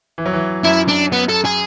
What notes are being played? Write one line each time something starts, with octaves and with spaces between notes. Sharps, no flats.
E3
F#3
E3
F#2 E4
D4
B3
A4
G#4